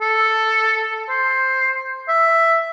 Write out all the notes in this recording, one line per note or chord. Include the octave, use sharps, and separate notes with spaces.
A4
C5
E5